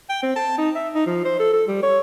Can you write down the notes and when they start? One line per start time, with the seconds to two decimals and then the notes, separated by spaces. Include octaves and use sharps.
0.10 G5
0.23 C4
0.36 A5
0.58 D#4
0.75 E5
0.95 D#4
1.06 F3
1.25 C5
1.40 A4
1.53 A4
1.68 G3
1.83 C#5